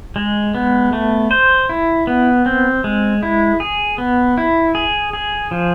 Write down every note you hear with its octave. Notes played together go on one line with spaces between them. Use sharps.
G#3
B3
A3
C5
E4
B3
C4
G#3
E4
G#4
B3
E4
G#4
G#4
F3